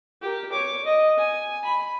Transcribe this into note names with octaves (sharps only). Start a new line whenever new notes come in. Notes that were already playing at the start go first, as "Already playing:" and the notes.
G4 A#4
C#5 D6
D#5
G#5
B5